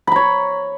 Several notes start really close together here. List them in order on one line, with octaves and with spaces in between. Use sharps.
B5 A#5 C#5